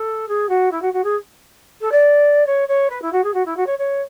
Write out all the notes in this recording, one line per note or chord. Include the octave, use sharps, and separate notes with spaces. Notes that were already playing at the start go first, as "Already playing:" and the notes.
Already playing: A4
G#4
F#4
E4
F#4
F#4
G#4
A4
D5
C#5
C#5
B4
E4
F#4
G#4
F#4
E4
F#4
C#5
C#5